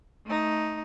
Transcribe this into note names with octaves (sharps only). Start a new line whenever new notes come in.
A3 D#4